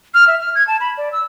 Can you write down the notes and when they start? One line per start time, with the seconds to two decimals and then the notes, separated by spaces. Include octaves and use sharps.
0.14 F6
0.27 E5
0.40 F6
0.55 G#6
0.67 A5
0.80 B5
0.97 D5
1.12 E6